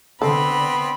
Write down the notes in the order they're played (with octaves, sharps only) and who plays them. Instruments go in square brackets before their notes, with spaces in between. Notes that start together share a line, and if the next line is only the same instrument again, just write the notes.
[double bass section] D3 [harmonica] B3 C4 [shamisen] A4 [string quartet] B5